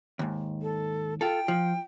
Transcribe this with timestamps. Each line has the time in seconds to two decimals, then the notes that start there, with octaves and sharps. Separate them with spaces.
0.19 D#2 G#2
0.62 A4
1.21 F4 A4 G5
1.48 F3